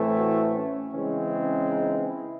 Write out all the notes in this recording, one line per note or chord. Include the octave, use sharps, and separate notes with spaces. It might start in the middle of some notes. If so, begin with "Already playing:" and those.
Already playing: A2 E3 A3 C4
F#4
C#4
C#3 E3 G#3 C4 C#4
C#4
D#4
E4